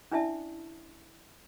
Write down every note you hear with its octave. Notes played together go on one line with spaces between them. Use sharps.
C#4 D4 E4 D5 E5 A5